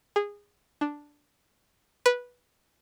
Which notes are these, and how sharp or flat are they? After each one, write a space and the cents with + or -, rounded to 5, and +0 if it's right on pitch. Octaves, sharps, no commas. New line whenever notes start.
G#4 -20
D4 +0
B4 -10